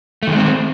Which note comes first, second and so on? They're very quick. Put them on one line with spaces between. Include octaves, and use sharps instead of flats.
A3 D#3 G#3 C4